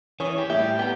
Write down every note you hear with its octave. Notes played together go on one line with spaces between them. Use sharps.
E3 C#4 G#4 C#5 D#6
G4
A2 G3 E4 E5 G5
B3 G4 A#5